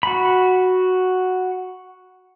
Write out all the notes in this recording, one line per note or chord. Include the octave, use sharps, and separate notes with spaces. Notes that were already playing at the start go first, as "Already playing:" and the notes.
F#4 B5